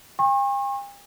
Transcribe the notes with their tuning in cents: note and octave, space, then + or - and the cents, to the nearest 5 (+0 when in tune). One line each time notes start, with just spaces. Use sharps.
G5 +45 C#6 -40